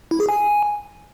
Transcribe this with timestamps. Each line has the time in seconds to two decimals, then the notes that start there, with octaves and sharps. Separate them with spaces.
0.11 E4
0.20 G#4
0.29 G#5